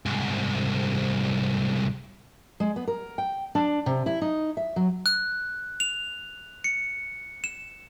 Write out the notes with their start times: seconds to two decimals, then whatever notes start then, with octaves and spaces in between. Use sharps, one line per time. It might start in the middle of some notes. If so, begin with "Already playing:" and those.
0.06 C2 G#2
2.60 G#3
2.76 B3
2.88 A#4
3.18 G5
3.55 D4
3.86 C3
4.06 E4
4.22 D#4
4.57 E5
4.76 F#3
5.06 F#6
5.80 F7
6.64 C#7
7.44 E7